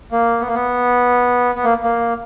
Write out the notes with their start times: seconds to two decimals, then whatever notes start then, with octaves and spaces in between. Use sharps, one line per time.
0.12 A#3
0.41 B3
0.47 A#3
0.54 B3
1.55 B3
1.64 A#3
1.83 A#3